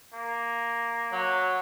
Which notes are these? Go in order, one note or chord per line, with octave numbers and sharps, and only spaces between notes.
A#3
F#3